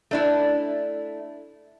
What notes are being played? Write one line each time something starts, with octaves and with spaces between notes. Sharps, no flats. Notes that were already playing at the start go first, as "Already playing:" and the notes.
A3 D4 E4